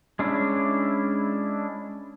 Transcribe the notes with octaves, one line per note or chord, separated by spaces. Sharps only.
G#3 C#4 D4 E4